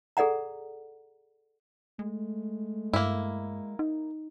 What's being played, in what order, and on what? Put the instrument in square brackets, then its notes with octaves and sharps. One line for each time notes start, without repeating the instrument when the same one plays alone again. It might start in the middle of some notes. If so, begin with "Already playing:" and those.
[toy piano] G#4 A4 D5 F#5 A#5
[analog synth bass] G#3 [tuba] A3
[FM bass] G2 [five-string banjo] A#3 E4
[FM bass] D#4